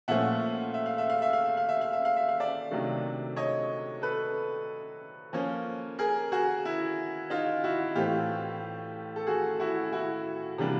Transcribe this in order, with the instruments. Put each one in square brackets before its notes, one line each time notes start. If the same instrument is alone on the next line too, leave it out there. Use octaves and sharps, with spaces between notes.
[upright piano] A#2 F3 A3 C#4 E5 F#5
E5
F5
E5
F5
E5
F5
E5
F5
E5
F5
E5
F5
E5
F5
D5 E5
C3 D#3 F#3 A3 D4
C#5 D#5
A4 B4
F3 A#3 C#4
G#4 A#4
F#4 G#4
E4
D#4 F4
E4 F#4
A2 E3 A3 C4 F4 G4
A4
F#4 G#4
E4 F#4
E4 F#4
C3 E3 G3 A#3 D4